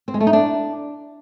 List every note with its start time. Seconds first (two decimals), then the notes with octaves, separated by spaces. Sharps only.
0.08 C4
0.14 G#3
0.20 A3
0.27 D#4
0.33 D4